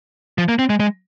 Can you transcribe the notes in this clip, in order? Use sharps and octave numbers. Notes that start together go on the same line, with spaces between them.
F3
A#3
C4
G#3
G#3